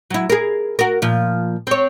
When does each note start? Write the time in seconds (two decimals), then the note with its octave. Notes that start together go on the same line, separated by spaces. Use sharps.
0.10 F#3 E4
0.30 G#4 A#4
0.79 F#4 A#4
1.02 A#2 F3
1.67 C4 C#5